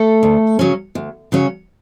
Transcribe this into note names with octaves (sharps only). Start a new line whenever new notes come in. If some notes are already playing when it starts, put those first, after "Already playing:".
Already playing: A3 A4
D2
C#3 F#3 C#4
D2
C#3 F#3 C#4